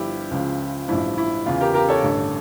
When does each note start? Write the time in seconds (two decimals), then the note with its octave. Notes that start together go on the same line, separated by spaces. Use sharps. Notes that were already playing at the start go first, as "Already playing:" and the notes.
Already playing: G1 G2 F3 E4 G4
0.31 C#2 C#3 F3
0.88 A1 G2 F3 E4
1.18 E4
1.46 E2 C#3 E3 F4
1.61 G4 A#4
1.74 G4 A#4
1.88 A4 C#5
2.03 A1 G2 D3